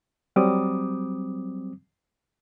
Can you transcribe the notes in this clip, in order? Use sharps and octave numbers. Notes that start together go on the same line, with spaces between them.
F#3 G3 C4 D6 D#6